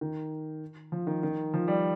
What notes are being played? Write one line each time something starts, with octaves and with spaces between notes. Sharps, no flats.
D#3
F3
D#3
D#3
F3
G3